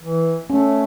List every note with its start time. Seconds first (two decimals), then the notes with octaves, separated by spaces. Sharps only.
0.02 E3
0.50 A3 C#4